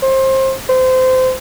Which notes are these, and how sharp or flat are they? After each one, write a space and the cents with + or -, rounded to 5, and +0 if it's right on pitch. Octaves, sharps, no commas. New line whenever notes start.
C5 +25
C5 -25